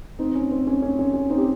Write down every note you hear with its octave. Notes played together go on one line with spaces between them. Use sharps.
C4 D#4
C#4
C4
C#4
C#4
C#4
C#4
C4 D#4
G4